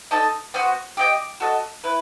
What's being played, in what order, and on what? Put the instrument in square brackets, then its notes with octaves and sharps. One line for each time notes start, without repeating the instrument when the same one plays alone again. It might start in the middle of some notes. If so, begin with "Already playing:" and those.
[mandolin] D#4 A4 D#5 A5
B3 F#4 C5 F#5
G4 D#5 G5
F#4 A4 D#5
E4 B4